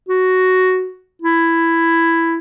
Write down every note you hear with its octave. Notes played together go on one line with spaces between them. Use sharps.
F#4
E4